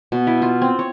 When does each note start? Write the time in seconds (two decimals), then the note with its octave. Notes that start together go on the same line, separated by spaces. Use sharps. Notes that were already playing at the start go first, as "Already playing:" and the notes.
0.12 B2
0.27 E4
0.42 F4
0.62 C4
0.79 C#5